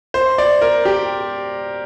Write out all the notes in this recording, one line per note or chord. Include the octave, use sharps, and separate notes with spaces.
C5
D5
A#4
G4